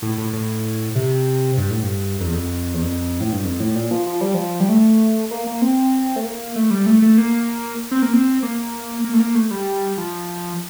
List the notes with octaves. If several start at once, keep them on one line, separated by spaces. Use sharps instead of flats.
A2
A2
A2
C3
G2
A2
G2
F2
E2
F2
E2
F2
A2
G2
F2
A2
A#2
F3
F3
G3
F3
G3
A3
A#3
A#3
C4
A3
A#3
A3
G3
A3
A3
A#3
C4
A#3
C4
A#3
A#3
A3
A#3
A3
G3
F3